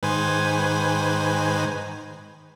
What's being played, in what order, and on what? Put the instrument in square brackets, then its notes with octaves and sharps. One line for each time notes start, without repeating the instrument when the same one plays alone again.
[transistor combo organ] G#2 D#3 [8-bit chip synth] B4 C5 G#5